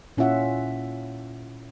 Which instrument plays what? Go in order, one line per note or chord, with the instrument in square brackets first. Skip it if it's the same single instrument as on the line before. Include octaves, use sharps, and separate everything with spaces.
[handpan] A#2 C#4 E4 F4 E5 F#5